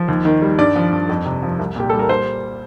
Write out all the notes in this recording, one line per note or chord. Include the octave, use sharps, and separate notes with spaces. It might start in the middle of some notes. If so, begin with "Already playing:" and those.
Already playing: F3
D#2
D#3
G3
G2 D5
F3
G2
F2
C3
F3
C2
A#2 G4
G3 A4
A#4
C5